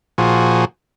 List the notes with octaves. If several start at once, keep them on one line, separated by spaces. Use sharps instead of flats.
A#2 F3 F#4 G#4